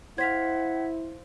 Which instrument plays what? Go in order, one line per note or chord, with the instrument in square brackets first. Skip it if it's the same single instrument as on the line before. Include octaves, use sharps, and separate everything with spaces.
[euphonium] E4 [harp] C5 F5 [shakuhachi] F#5 [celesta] G#6 B6